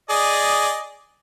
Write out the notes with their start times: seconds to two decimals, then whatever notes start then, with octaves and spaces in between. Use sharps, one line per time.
0.10 G#4 D5 D#5